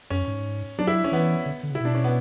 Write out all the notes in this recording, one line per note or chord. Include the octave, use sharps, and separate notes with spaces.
F#2 C#4
G#2
F#3 D4
E4
C#4
E3 B3
D3
D3
C#3
E4
B2 D4
C#4
B3